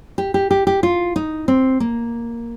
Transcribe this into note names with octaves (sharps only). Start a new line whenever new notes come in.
G4
G4
G4
G4
F4
D#4
C4
A#3